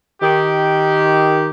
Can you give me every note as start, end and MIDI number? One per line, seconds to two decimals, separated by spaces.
0.23 1.51 51
0.23 1.51 67